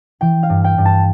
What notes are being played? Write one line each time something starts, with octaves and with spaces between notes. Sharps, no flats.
E3 G5
F5
G2
G5
G2
A5